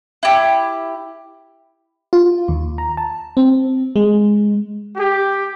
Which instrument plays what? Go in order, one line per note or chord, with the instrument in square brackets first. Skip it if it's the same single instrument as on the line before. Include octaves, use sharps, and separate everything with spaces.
[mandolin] E4 G4
[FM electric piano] F4
D#2
A#5
A5
C4
G#3
[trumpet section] G4